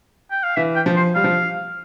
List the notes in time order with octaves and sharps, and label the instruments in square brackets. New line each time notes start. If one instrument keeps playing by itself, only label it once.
[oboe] G5
F5
[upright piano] E3 [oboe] E5
[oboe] G5
[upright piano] F3
[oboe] C5
[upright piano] G3 [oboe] F5
[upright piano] F3